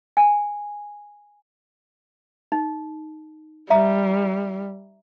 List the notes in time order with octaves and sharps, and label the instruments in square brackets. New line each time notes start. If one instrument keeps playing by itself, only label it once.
[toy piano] G#5
D#4
[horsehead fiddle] G3 [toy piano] E5 A#5 D#6